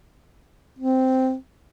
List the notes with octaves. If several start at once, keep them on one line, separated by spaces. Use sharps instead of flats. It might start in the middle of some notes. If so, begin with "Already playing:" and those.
C4